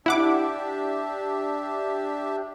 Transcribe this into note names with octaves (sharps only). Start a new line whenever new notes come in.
D4 E4 G4 E5 F#5 D6